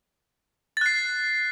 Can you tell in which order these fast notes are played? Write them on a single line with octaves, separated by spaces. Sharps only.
A6 F#6 C7